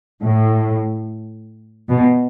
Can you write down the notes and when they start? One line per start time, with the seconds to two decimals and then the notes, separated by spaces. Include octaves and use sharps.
0.23 A2
1.89 B2